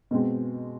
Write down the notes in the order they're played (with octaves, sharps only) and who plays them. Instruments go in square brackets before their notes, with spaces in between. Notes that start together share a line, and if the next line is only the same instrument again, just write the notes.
[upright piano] B2 G#3 C4